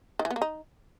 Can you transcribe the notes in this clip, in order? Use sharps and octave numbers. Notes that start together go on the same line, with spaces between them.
D#3
E3
B3
A#3
D#4